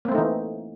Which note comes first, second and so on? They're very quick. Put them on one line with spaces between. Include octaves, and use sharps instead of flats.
A#3 C4 A3 D#4 E3